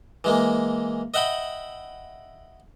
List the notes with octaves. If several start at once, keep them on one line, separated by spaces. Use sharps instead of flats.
E3 G#3 A#3
D#5 E5 F#5 G5 B5